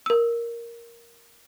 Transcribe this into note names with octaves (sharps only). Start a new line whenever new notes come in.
A#4 E6